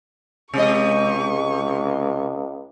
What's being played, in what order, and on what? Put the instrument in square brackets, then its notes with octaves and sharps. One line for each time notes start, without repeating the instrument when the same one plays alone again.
[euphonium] C#2 [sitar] C3 D#5 [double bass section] G#3 [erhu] C#6